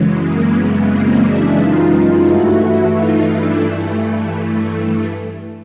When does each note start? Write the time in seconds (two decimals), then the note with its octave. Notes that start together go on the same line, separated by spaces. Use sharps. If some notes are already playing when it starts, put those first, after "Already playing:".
Already playing: F#2 C#3 E3 G#3
0.19 A#3
0.53 B3
0.88 A#3 C4
1.22 D4 E4
1.57 D#4 F4
2.27 G2 E3 A3 E4 F#4
2.62 E4 F#4
2.96 D#4 F4
3.31 D4 E4